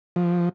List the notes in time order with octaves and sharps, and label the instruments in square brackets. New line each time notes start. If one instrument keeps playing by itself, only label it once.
[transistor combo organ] F3